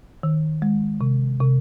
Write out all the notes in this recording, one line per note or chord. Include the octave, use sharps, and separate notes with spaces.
D#3
G#3
C3
C3